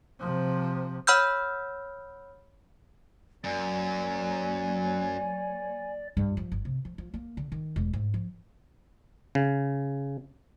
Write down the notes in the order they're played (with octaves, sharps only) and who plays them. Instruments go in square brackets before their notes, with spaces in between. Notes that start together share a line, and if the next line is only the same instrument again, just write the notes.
[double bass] C3 F3
[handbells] C#5 F#5 B5 E6 F6 G6
[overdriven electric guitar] F#2 [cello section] F#3 A#3 C#5 [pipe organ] D5 [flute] G#5
[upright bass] G2
F3
G1
C3
F3
F3
A#3
D3
D#3
E1
G#2
F3
[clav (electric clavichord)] C#3